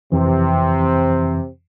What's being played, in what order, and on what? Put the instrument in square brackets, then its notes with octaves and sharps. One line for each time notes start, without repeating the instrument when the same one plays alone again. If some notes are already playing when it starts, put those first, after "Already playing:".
[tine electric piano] F2 E3 [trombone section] C3 C4